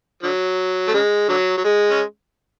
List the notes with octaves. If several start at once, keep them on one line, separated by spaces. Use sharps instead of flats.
D3 F#3
A3
C#3 G#3
D3 F#3
F#3
G#3
C#4